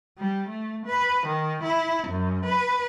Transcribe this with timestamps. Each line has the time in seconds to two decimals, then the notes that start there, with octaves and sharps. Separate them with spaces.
0.18 G3
0.49 A3
0.87 B4
1.27 D#3
1.64 E4
2.08 F#2
2.46 B4